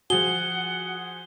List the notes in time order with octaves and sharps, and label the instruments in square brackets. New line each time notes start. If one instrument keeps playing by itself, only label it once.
[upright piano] F3 G#4 [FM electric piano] F#4 [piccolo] F#5 [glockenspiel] G7